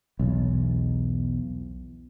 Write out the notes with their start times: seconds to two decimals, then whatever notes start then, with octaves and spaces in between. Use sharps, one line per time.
0.19 B1 E2